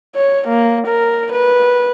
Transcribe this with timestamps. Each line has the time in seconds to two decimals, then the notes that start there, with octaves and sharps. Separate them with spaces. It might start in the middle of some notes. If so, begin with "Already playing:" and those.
0.16 C#5
0.48 A#3
0.88 A#4
1.32 B4